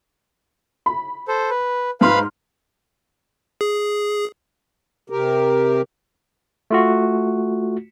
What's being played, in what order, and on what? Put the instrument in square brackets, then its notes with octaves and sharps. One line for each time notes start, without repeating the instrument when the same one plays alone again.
[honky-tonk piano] B5
[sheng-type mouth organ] A4 C5
B4
[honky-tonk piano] G#2 C6 F6 [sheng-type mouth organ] B4 F5 B5
[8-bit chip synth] G#4
[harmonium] C3 G4 A#4
[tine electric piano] A3 F4 F#4